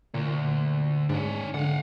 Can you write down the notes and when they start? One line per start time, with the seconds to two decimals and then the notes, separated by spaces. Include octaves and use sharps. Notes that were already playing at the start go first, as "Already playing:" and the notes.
0.14 D2 A#2
1.09 G#2 D4 C#5
1.54 D3 F5 F#5